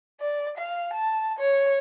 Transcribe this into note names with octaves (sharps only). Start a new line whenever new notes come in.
D5
F5
A5
C#5